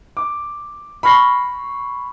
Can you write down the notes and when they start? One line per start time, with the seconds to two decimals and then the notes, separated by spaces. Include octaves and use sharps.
0.17 D6
1.03 B5 C#6 F6 A#6 C7